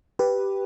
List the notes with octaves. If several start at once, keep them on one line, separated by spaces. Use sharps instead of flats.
G4 B4